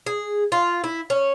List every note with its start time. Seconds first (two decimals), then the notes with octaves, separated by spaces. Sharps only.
0.06 G#4
0.52 F4
0.84 E4
1.10 C#4